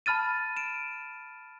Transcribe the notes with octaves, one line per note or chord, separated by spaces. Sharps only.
A5 B5 F6 A6 D#7
D7 E7